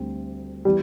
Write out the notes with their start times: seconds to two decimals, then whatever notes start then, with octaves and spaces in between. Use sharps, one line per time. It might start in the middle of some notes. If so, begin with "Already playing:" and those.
Already playing: D2 D3 G3 C4
0.65 E3 G3 B3